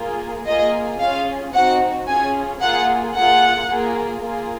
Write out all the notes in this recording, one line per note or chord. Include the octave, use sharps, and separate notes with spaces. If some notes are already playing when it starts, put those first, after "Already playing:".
Already playing: A#3 F4 G#4
A#3 F4 G#4 D#5
C#4 F4 G#4 F5
C4 D#4 F#4 F#5
C#4 F4 G#4 G#5
A#3 F4 G#4 F#5
A#3 F4 G#4 F#5
A#3 F4 G#4
A#3 F4 G#4